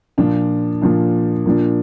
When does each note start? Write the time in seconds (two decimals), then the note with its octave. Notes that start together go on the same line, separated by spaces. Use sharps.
0.18 A#2 F3 D4 F4
0.82 A#2 F3 D4 F4
1.46 A#2 F3 D4